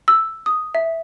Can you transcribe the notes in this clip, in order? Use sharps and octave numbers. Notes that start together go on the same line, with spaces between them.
E6
D#6
E5